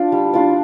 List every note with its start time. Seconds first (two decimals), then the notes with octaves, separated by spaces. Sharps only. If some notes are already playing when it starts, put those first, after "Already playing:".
Already playing: D4 F4 D5
0.12 G3
0.33 D4 F4 D5